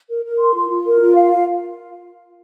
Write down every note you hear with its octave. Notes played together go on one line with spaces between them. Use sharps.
A#4
A#4
C6
F4
F4
A#4
F4
F5
F5